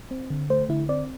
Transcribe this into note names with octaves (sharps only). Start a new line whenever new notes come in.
C4
D3
A3 C5
D3 E4
C4 D5